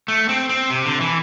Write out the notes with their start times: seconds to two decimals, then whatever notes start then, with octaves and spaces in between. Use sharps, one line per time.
0.08 A3
0.29 C4
0.49 C4
0.70 C3
0.85 D3
1.01 E3